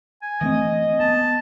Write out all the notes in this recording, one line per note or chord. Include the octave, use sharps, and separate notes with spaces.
G#5
E3 A3 C4 D#5
B3 A5